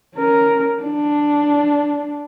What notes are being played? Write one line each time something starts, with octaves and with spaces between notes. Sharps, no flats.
C#4 A#4
D4